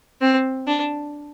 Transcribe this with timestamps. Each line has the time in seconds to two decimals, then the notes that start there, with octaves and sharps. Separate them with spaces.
0.21 C4
0.67 D4